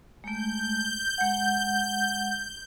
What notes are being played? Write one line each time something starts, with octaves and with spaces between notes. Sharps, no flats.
G#3 A3 G6
G#3 F#5